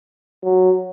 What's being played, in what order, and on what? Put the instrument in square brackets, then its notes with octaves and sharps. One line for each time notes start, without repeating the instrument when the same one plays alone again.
[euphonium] F#3